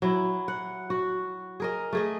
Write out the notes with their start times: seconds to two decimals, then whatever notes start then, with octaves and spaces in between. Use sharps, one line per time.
0.02 F#3 E4
0.48 F#5
0.90 F#4
1.60 G#4 A#4 D#5
1.93 A3 G#4 D#5